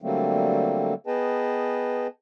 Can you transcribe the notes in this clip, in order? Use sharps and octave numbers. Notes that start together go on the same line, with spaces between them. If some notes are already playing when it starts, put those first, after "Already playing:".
D3 F#3 G3 A3 A#3 C4
B3 G#4 B4 D#5 G5 A5